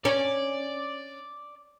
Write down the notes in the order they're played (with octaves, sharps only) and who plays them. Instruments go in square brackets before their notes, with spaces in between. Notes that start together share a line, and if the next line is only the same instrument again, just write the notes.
[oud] C#4 [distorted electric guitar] D5